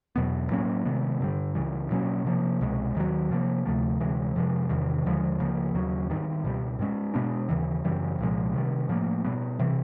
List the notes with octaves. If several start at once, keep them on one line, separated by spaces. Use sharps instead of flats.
E2 B2 F#3 B3
A2 F#3 A#3 C#4
C3 D#3 G#3 B3
G2 D3 G3
C#2 C#3 E3 G3
B2 F#3 A#3 C#4
C3 F3 A#3
C2 B2 G#3
D#2 D#3 F#3
C3 F3 A#3
D2 C3 F3 A3
D2 C3 E3 G#3
F2 C3 F3 G#3
E2 C3 D#3 G3
D#2 D3 F3 G#3
C#2 C#3 F3 A#3
D#2 C#3 F#3
G#2 D#3 G3
C#2 B2 G3
G#2 F3 G#3 C#4
B2 G#3 B3 D4
D#2 C#3 E3
F#2 C#3 E3 G3
C2 A#2 F3 G#3
C3 D#3 G3
A2 F3 A#3
B2 G3 B3
C3 E3 G3